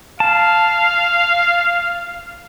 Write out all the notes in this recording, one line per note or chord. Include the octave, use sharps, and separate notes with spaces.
F5 A5